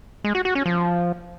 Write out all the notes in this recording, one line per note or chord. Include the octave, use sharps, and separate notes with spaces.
G#3
F#4
F#4
C#4
F3